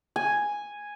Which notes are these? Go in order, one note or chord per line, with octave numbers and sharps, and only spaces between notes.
G#5